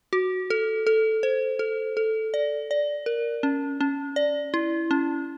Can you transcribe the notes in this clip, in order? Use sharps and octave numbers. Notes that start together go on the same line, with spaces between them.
F#4
A4
A4
C5
A4
A4
D5
D5
A#4
C#4
C#4
D5
E4
C#4